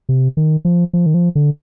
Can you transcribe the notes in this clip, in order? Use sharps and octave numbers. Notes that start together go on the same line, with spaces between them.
C3
D#3
F3
F3
D#3
F3
D3